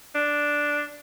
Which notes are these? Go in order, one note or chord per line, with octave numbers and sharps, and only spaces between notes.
D4